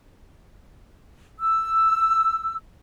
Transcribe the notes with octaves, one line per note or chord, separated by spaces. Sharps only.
E6